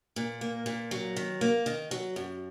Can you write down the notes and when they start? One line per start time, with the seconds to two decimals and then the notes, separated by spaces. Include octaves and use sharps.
0.16 A#2
0.41 A#3
0.66 A#2
0.91 F#3
1.16 D#3
1.41 A#3
1.66 D#3
1.91 F#3
2.16 F#2